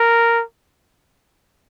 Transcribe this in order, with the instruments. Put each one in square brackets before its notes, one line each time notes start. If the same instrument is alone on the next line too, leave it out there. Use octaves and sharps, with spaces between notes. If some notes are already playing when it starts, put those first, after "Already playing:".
Already playing: [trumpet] A#4